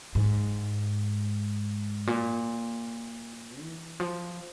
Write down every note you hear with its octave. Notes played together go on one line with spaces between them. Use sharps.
G#2
A#2
E3
F3